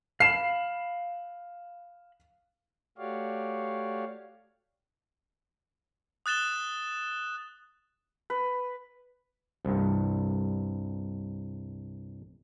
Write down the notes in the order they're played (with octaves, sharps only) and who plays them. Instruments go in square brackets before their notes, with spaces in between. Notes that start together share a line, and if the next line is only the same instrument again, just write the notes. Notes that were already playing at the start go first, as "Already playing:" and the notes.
[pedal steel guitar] F5 B5 [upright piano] C7 E7
[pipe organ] A3 F#4 G4 C#5 D5 F5
[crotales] D#6 F#6 A6 E7 G7
[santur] B4
[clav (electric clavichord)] C2 G2